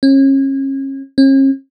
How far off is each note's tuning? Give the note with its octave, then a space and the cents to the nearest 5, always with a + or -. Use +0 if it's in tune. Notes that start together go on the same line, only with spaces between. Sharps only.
C#4 -35
C#4 -45